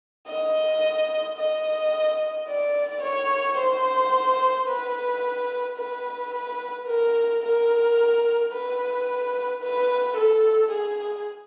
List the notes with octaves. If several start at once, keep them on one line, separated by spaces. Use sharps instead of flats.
D#5
D#5
D5
C#5
C5
B4
B4
A#4
A#4
B4
B4
A4
G#4